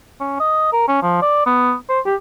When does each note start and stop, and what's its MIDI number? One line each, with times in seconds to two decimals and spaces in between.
0.20 0.39 61
0.40 0.69 75
0.72 0.88 70
0.88 0.98 61
1.02 1.20 53
1.22 1.41 74
1.46 1.73 59
1.89 1.99 72
2.06 2.15 67